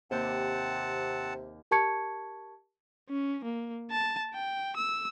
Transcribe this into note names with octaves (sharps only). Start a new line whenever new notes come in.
D#2 C3 C4 G4 F#5 A5
G4 A#4 A5 C#6 G#6 C#7
C#4
A#3
A5
G5
E6